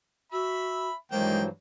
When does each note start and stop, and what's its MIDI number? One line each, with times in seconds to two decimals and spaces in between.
0.32 0.88 66
0.32 0.94 76
0.32 0.94 83
1.12 1.49 43
1.12 1.43 51
1.12 1.49 52
1.12 1.49 54
1.12 1.41 56
1.12 1.43 58
1.12 1.48 72
1.12 1.43 79